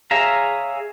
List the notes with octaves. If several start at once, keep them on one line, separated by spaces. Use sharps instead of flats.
G#4 C#5 E5 F5 A#5